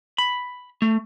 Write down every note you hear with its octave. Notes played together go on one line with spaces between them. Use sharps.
B5
A3